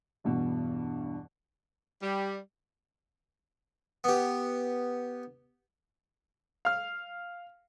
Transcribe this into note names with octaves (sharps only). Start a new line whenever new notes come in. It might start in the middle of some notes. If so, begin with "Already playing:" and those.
E2 G2 B2
G3
B3 G4
F5 F6